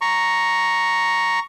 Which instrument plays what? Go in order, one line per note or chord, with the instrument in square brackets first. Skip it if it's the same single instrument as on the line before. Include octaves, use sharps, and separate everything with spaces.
[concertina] A#5 C#6